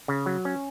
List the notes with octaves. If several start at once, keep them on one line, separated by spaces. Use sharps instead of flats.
C#3
F#3
C#4